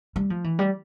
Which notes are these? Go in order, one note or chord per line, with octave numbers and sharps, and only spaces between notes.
G3
F3
E3
G3